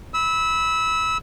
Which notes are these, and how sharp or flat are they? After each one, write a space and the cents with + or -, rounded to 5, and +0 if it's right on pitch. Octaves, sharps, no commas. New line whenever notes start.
B5 +0 E6 -20